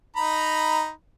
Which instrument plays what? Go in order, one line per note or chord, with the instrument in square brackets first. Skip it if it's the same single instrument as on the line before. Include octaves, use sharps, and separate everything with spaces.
[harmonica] D#4 A#5 B5